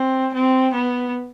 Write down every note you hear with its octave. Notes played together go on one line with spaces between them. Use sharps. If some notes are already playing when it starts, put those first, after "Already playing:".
Already playing: C4
C4
B3